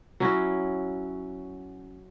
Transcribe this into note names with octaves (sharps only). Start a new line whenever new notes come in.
F#3 C#4 E4 F#4